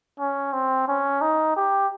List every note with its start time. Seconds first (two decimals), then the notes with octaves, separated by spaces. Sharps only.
0.19 C#4
0.53 C4
0.88 C#4
1.21 D#4
1.56 G4